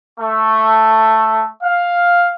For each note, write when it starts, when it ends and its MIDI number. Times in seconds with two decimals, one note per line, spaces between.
0.19 1.46 57
1.63 2.33 77